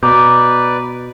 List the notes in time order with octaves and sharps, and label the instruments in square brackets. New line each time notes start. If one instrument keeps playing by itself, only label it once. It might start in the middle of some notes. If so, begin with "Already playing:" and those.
[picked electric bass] B2 [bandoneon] B4 D5 [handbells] A#5 D6 G6